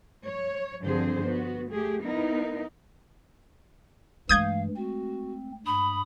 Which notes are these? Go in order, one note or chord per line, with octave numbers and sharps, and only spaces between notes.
C#5
G2 D3 F3 C4 G#4 C5
B3 F#4
A3 G4 G#4
B3 D#4 E4 A#4
G2 E3 G#3 A3 F5 D#6 G6 G#6
C4 F#4
G2 B5 D#6